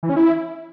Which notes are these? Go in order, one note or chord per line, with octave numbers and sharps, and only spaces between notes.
E3
C#4
E4